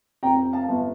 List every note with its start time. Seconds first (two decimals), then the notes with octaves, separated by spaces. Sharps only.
0.23 F2 G5 A#5
0.53 F5 A5
0.69 G1